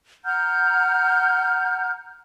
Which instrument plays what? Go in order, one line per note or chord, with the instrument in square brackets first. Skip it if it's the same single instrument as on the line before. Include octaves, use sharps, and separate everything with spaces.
[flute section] F#5 A#5 F6 G6